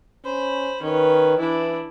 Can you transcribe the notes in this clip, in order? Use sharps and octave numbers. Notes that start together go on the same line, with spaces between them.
C#4 C5 B5
D#3 C#4 B4
E3 D4 E4